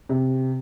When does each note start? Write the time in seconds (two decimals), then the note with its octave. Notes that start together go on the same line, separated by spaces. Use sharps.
0.09 C3